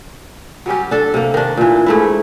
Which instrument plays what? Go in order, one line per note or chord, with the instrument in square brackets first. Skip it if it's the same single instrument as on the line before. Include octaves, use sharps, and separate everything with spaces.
[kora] F#3 G3 C#4 G4
D4 A4
C3 A#3
D#3 D4
A#2 E3
G#2 A3 E4